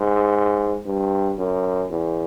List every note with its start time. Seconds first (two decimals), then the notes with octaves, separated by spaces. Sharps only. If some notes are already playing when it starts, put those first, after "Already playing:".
Already playing: G#2
0.86 G2
1.38 F#2
1.91 E2